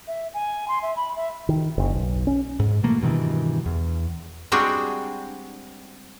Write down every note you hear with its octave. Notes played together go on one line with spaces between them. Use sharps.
E5
G#5
C6
E5
B5
E5
D#3
F#1
B1
C#4
G#2
B2 E3 A3 A#3
G2 B2 D#3 E3
E2
G3 G#3 C4 D4 F#4 G#4